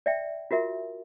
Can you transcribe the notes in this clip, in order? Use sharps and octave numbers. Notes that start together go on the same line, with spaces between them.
D5 E5 G5
F4 F#4 A#4 E5